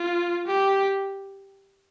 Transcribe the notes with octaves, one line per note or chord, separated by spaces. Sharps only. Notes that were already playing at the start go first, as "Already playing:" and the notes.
Already playing: F4
G4